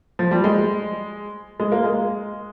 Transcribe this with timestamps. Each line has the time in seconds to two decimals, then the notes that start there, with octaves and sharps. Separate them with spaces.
0.19 F3
0.31 G3
0.44 G#3
1.60 G#3
1.72 A#3
1.84 G#3